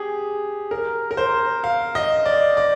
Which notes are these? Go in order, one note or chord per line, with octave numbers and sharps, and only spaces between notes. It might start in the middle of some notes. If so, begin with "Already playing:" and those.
Already playing: G4 G#4
A#4
A#4
C5
F5
D#5
D5
D5